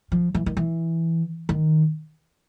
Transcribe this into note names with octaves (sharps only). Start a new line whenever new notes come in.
F3
E3
D#3
E3
D#3